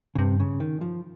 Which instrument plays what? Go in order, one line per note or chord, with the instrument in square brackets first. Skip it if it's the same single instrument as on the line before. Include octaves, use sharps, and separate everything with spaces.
[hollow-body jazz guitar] C#3
[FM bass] G2 [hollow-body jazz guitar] C3
[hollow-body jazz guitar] C#3
D#3
F3